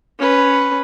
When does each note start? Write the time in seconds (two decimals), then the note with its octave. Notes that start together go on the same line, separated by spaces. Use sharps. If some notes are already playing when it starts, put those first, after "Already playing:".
0.19 C#4 B4